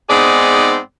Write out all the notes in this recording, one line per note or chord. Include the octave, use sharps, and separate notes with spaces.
G#2 B3 C4 D#4 G#4 D5